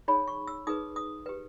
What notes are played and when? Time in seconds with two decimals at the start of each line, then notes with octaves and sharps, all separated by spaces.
0.08 D#4 G#4 C#5 B5
0.28 C#6
0.47 E6
0.67 D#4 G#4 B4 D#6
0.96 D#6
1.26 G4 B4